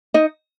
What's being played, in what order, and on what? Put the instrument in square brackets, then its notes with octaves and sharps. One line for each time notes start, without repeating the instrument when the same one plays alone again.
[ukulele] D#4 D#5